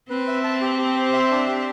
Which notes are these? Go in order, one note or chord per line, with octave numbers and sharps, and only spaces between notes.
C4 B4
E5
A5
G4
G4
C5
E5
D4
G4